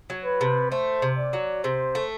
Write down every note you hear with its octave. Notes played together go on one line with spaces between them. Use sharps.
F#3
B4
C3
A3 C5
C3
D5
F#3
C3 C5
A3